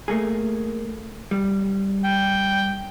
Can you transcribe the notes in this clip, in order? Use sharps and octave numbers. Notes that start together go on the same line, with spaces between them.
A3 A#3 G#4
G3
G5